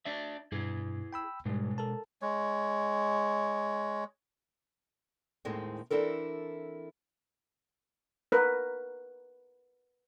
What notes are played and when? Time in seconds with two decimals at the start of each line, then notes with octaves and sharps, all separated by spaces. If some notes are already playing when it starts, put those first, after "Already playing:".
0.05 D4 D5 E5
0.52 G2 B2 E4 G#4
1.13 G5 B5 E6
1.45 G#2 B2 G3 G#3
1.78 A4 A#4 A5
2.22 G#3 C#5
5.45 D#2 A2 D#3 G#3 C4
5.90 E3 C4 D4 E4 A4 A#4
8.32 A#4 B4